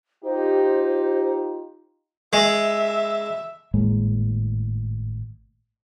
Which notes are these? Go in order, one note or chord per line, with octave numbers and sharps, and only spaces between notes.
D#4 F4 G4 C5
G#3 E5
G#1 A2 G#3 A#3